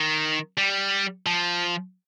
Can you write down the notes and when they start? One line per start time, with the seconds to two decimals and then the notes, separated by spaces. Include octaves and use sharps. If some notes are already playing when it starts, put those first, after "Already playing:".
Already playing: D#3
0.58 G3
1.26 F3